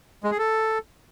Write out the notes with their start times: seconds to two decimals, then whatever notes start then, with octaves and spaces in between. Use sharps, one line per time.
0.24 G#3
0.31 G#4
0.38 A4